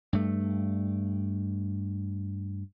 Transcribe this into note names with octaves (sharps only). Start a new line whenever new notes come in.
G2 A3